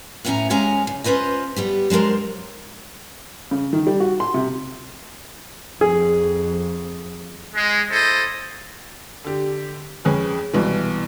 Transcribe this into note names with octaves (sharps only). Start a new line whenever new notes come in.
A2 B3 C#4 G5 G#5 A#5
F2 G#3 C#4 C#5 G#5 A#5
C#3
C#4 F4 B4 C5 D#5
G3 B3 G4
F#3 G#3 D4 A#4 C5
C#3
D#3
G3
F#4
C6
C3
F2 G#4
G#3
E4 A4 C5 D#5
D3 G4
F2 C#4 G#4 B4
C2 B2 E3